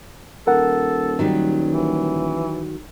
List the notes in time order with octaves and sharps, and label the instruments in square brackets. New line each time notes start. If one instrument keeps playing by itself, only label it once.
[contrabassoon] D#1 [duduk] A4 [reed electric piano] A#4 F#5
[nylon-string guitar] D#3 F#3 G3
[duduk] E3